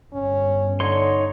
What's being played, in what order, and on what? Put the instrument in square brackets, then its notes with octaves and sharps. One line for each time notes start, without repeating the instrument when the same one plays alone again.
[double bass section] G1 [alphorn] C#4
[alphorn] D3 [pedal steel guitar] D#4 C#5 C6